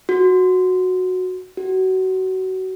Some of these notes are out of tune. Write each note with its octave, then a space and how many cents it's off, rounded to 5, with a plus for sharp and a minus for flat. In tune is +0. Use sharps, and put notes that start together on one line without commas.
F#4 -5
F#4 +25